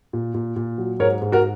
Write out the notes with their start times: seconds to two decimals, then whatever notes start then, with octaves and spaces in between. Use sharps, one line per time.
0.13 A#2
0.34 A#2
0.56 A#2
0.78 F#3
1.00 G#2 A#4 C#5
1.22 G#2
1.32 F#4 A#4